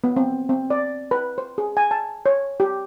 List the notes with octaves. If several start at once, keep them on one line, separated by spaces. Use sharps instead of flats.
B3
C4
C4
D5
B4
C5
G#4
G#5
A5
C#5
G4